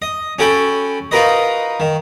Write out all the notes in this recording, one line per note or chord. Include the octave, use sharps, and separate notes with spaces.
D#5
C#4 F#4 A4 G5 B5
D#4 F4 F#4 A#4 B4 D#5
D#3